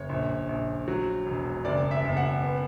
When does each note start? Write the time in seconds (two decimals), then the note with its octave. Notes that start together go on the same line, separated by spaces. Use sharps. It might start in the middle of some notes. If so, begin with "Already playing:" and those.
Already playing: F#1 C#5
0.09 A#1
0.49 A#1
0.88 F#3
1.26 E1
1.65 F#1 D5
1.91 E5
2.05 F#1
2.17 F#5
2.43 B3